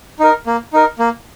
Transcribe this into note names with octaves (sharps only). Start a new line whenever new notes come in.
D#4 A#4
A#3
D#4 A#4
A#3